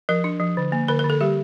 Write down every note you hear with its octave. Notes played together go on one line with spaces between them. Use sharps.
F3 A#4
D4
F3
D3
A#3
D3 A#4
A#4
D3
A4
G3 G4